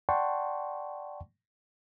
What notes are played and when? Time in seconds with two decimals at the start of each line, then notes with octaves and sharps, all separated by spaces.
0.09 D5 F#5 G5 A5 C6 C#6